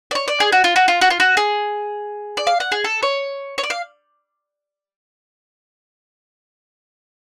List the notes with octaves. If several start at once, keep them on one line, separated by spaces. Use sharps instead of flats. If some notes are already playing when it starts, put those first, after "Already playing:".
D5
C#5
D5
G#4
F#4
F4
F#4
F4
F#4
F4
F#4
G#4
D5
F5
F#5
G#4
A4
C#5
C#5
D5
F5